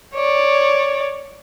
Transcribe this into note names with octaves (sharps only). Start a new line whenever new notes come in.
C#5 D5